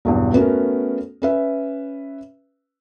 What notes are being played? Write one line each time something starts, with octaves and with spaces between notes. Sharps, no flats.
B1 E2 G2
A3 B3 C#4 F#4 A#4
C#4 B4 E5